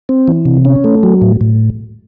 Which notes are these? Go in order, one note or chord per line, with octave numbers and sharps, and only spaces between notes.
C4
E3
C3
C#4
A3
F#3
A2
A2